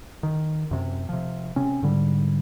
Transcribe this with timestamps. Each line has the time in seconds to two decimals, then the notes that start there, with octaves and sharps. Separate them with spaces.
0.23 D#3
0.71 F#2 C3
1.09 C3 F3
1.56 C3 C4 C#4
1.83 G#2 D3 G3